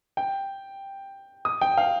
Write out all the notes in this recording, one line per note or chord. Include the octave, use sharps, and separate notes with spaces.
G5
D#6
G5
F5